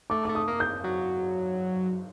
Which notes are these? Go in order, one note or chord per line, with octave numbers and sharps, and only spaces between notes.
A3 D6
A3 D6
D#6
A#3
G6
F#3